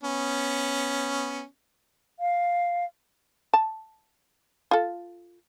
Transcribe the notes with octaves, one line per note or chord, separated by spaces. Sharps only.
B3 C#4
F5
A5
F4 A4